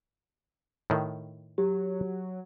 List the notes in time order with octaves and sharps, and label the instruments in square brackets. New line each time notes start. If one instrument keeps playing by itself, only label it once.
[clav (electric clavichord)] A2 D#3
[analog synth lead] F#3 [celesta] G4